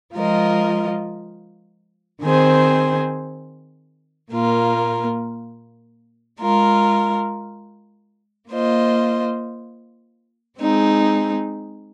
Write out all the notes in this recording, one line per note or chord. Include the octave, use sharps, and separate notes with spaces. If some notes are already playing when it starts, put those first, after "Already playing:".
F3 G#3 F4 A#4 D#5
D#3 C4 G#4 C5
A#2 A#3 F4 A#4
G#3 F4 A#4
A#3 F4 C5 D#5
G#3 C4 D#4 G#4